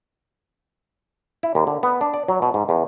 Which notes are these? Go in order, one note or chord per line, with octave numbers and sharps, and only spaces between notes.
E4
D#2
D3
B3
D4
D5
F#3
B2
G#2
E2